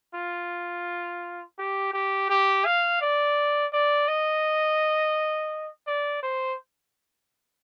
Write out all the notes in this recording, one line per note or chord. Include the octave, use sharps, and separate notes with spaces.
F4
G4
G4
G4
F5
D5
D5
D#5
D5
C5